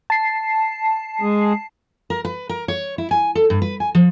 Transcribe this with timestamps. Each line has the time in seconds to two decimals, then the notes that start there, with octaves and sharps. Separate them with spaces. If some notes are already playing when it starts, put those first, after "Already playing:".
0.10 A5 C7
1.21 G#3 G#4
2.10 A#4
2.25 B4
2.49 A#4
2.68 C#5
2.98 E4
3.11 G#5
3.35 A4
3.50 G2
3.62 B4
3.80 G#5
3.95 F3